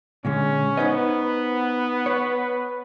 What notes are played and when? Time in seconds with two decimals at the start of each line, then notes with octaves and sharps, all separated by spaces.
0.25 A#2 D3 G#3 C#4
0.77 B3 D#4 C5 D#5
1.20 B4
2.06 C#5